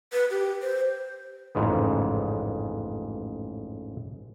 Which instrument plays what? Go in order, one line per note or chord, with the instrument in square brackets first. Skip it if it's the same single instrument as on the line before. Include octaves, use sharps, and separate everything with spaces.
[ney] B4
G4
C5
[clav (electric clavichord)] A1 F2 G#2 C#3 B3